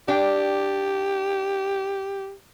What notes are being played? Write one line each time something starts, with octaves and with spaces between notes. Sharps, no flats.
D4 G4 G5